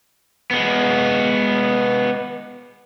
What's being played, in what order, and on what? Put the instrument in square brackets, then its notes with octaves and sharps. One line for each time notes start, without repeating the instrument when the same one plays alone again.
[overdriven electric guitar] G#3 B3